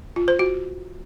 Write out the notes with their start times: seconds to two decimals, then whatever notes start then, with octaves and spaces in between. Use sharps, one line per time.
0.16 F4
0.28 C5
0.39 F#4